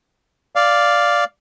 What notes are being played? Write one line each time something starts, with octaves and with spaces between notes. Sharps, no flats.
D5 F5